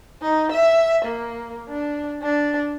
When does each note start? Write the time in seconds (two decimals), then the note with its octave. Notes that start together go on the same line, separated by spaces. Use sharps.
0.21 D#4
0.52 E5
1.05 A#3
1.68 D4
2.22 D4